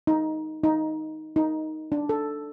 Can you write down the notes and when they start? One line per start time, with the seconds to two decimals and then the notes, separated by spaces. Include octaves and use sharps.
0.07 D#4
0.64 D#4
1.36 D#4
1.92 D4
2.09 A4